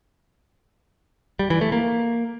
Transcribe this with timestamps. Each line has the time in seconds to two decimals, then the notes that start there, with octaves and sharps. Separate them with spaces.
1.39 G3
1.50 E3
1.61 A3
1.72 A#3